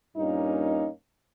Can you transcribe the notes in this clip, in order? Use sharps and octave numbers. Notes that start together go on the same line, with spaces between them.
G2 A#2 A#3 C#4 D#4